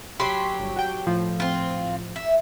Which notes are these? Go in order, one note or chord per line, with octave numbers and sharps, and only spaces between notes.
F#3 G4 B5 C6
G1
F#4 G5
A2 F3
C4 F4
E5